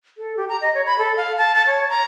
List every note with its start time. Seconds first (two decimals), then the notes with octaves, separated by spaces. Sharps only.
0.18 A4
0.37 G4
0.49 A#5
0.61 D#5
0.74 C#5
0.86 B5
0.99 A4
1.17 F5
1.37 A5
1.55 A5
1.67 C#5
1.89 A#5